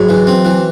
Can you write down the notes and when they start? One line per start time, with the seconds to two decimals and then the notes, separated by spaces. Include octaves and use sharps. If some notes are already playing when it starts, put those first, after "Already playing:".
Already playing: G#2 F#3
0.09 E3
0.27 C4
0.45 E3